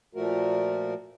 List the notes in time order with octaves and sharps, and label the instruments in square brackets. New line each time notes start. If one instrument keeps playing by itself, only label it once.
[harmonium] A#2 F3 A3 F#4 A#4